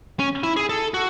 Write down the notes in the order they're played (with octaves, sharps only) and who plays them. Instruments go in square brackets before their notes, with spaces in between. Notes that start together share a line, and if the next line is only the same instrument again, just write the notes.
[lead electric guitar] C#4
E4
G#4
A4
F#4